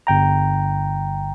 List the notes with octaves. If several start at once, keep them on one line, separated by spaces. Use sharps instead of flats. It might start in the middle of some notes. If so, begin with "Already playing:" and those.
G1 G5 A#5